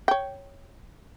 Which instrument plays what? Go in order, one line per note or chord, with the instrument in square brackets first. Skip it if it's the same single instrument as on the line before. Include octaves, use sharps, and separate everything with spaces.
[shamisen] C#5 G5